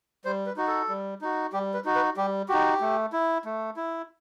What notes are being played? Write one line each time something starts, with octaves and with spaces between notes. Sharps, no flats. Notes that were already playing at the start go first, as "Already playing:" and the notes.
G3 C5
B4
D#4 F#4
A4
G3
D#4 F#4
G3 G4
B4
D#4 F#4
B4
G3 G4
D#4 F#4 G4
A3
E4
A3
E4